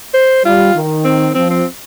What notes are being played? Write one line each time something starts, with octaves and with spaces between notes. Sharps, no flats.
C5
G3 F4
D#3
C4
F3 C4
C4